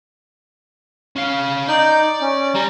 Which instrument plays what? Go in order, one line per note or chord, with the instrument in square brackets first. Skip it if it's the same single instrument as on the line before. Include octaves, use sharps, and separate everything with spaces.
[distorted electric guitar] C#4 F5
[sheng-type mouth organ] D#4 G6 [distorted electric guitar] D5
[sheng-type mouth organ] C#4
[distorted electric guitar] G3 [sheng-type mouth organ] A#5